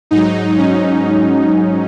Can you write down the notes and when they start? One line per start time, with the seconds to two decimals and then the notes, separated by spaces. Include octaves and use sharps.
0.11 G#2 F#3 D#4
0.58 C#4
1.06 C#4
1.52 D#4